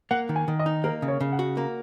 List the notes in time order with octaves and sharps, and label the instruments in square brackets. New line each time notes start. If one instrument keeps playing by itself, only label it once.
[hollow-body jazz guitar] A#3 [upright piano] F#5
[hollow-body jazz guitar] D#3
[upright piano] G#5
[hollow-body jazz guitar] D#3
[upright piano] D#5
[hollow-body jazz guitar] D#4
[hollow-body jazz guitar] A#3 [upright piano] A#4
[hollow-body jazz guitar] C#3
[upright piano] C#5
[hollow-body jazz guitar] C#3
[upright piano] F#5
[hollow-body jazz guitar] F#4
[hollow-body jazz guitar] A#3 [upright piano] A#5